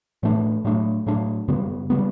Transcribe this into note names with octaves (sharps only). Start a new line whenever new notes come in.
A2 E3 A3 D4
A2 F#3 A3 D4
A2 F#3 A3 D4
F#2 C#3 G3 B3
C#3 G3 B3